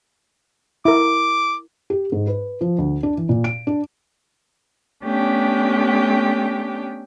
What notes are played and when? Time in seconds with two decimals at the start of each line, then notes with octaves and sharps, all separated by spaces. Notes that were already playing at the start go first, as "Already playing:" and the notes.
0.85 E4 A#4 D6
1.90 G4
2.12 G#2
2.27 B4
2.61 F3
2.78 D2
3.03 D4
3.17 E3
3.29 A#2
3.44 D7
3.67 D4
5.03 A3 B3 C#4 D4 G4 G5